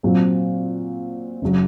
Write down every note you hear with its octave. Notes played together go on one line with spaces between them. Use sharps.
A#2 F#3 C4
F#1 F#3